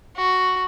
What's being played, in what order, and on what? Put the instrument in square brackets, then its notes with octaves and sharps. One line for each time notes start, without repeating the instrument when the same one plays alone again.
[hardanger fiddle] F#4